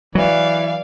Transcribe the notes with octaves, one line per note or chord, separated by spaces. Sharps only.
E3 F#3 D5 F5